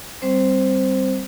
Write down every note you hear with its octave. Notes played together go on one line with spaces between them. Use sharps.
G3 C4 C5